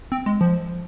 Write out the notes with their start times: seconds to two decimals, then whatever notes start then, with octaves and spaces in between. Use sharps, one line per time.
0.12 C4
0.26 G#3
0.41 F3